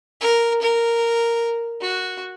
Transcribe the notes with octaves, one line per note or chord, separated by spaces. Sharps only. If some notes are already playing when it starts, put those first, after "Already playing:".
A#4
A#4
F#4